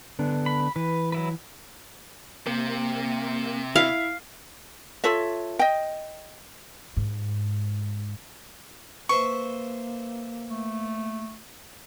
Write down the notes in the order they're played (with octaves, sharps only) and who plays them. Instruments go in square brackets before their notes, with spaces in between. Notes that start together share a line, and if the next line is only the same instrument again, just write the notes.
[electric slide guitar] D3 B3 D4
[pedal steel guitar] B5
[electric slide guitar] E3 [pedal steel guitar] B4
[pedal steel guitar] F#3 E4 B4
[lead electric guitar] C3 [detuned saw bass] A#3
[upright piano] E4 [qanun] F5
[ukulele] F4 A4 C#5 E5
D#5 G5
[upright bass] G#2
[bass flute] A#3 [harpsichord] B4 C5 E5 [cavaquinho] C#6
[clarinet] A3